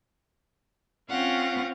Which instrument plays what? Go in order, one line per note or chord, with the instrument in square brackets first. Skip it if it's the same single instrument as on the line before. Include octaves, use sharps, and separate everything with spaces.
[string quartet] C4 C#4 F4 F5 F#5